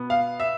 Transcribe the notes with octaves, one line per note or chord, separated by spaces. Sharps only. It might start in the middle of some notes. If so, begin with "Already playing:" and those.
Already playing: B2 B3
F5
E5